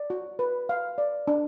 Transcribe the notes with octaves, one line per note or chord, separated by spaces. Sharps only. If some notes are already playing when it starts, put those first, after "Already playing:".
Already playing: D5
F#4
B4
F5
D5
D4